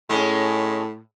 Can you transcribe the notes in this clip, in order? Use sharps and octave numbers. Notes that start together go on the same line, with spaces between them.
A2 G#3 C#4